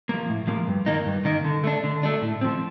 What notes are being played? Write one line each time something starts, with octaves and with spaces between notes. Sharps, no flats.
F3 A#3
A2
F3 A#3
G2
D#3 A#3 D#4
G2
D#3 A#3 D#4
D3
A3 D4
D3
A3 D4
A2
F3 C4